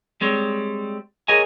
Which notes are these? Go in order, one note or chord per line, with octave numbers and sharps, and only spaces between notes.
G3 G#3 C4 C#5
G#4 A#4 C#5 D#5 G#5